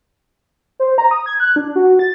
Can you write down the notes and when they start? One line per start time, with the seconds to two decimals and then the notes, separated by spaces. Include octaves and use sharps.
0.80 C5
0.98 A#5
1.11 D#6
1.26 G#6
1.40 F#6
1.56 D4
1.76 F#4
1.99 A6